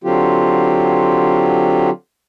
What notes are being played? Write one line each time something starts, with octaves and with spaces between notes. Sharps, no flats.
D3 F#3 C4 F4 G4